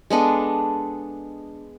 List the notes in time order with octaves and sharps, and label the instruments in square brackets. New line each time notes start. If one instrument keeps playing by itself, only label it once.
[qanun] G#3 B3 D4 A4